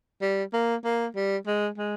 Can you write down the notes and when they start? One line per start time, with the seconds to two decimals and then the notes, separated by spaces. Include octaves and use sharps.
0.22 G3
0.53 A#3
0.84 A#3
1.15 G3
1.47 G#3
1.78 G#3